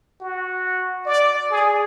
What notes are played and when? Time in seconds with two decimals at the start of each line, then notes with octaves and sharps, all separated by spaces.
0.21 F#4
1.06 D5
1.51 G#4